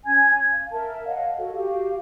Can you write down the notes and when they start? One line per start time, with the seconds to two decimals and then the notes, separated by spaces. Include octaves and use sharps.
0.05 C#4 G#5 G#6
0.49 F5
0.71 A#4 E5 A5
1.05 C#5 D#5 F5 F#5
1.37 F#4 A4
1.54 F#4 G4 F5